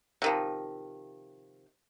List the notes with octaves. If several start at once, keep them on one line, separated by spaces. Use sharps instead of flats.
C3 D#3 F3